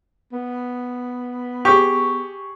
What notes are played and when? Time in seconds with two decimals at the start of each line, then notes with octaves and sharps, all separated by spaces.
0.32 B3
1.65 G4 G#4 C#6